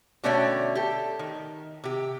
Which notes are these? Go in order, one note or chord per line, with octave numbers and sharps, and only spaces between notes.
B2 D3 A3 C#4 D5 G5
G4 A4
D#3
C3 G4